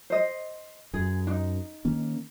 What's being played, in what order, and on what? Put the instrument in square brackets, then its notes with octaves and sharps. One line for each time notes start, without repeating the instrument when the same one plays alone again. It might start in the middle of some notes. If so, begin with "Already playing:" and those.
[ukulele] C5 D#5
[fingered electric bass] F#2 [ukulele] G#4
[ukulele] D4 D#4
[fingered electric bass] D#3 A#3 C#4